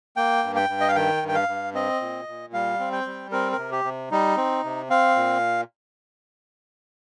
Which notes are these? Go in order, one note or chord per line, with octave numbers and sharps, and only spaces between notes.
A#3 G5
G2
G5
G2
D#5
F5
D#3 G5
G2
G5
F5
G2
C4 D#5
A#2
A#2
G3 F5
C4
G5
G3
C4 A#4
A#4
C3
G4
C3
G3 D#4
C4
C3
C4 F5
A#2